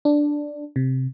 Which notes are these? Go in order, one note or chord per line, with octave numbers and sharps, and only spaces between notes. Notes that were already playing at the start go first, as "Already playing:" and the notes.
D4
C3